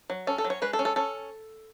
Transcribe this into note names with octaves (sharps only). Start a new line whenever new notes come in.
F#3
C#4 A4
A4
F#3
C#5
G#3 B4
A4
C#4
A4
C#4 A4